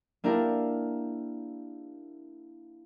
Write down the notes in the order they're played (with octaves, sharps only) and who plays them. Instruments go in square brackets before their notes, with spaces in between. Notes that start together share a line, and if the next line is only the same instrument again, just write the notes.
[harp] A#3 D4 E4 G4 A#4